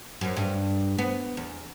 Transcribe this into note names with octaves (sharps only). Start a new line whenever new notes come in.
F#2
G2
B3
E2